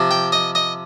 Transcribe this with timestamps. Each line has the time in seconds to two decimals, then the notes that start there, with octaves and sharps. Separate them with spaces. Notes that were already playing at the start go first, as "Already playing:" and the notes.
Already playing: C3 F3
0.11 G5
0.32 D#5
0.55 D#5